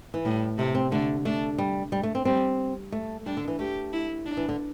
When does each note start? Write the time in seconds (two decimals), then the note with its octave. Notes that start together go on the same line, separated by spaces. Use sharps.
0.14 E3
0.25 A2 G3
0.58 C3 A3
0.75 C4
0.92 D3 A3
1.25 A3 D4
1.58 G3
1.92 G3
2.03 A3
2.15 C4
2.25 G3 C4
2.92 A3
3.26 G3 D4
3.37 D3
3.48 E3
3.59 A3 G4
3.93 E4
4.25 D4
4.37 E3
4.49 D3